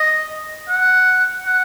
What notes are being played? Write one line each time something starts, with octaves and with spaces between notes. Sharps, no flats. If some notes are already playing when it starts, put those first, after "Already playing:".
Already playing: D#5
F#5
F#5